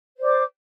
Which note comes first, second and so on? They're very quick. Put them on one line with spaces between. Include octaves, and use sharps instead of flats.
C5 D5 D6